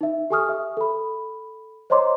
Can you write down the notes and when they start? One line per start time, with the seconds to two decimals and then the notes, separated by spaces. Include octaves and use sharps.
0.01 D#4 E5
0.30 G4 A4 G#5 C#6 D#6 F6
0.49 E5
0.77 A4 B5
1.90 C5 C#5 D#5 A#5 C6 D6